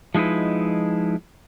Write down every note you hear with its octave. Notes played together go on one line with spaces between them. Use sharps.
F3 G#3 D#4 E4 B4